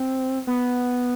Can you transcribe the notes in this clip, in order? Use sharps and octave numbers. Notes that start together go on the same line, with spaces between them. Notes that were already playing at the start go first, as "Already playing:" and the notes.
Already playing: C4
B3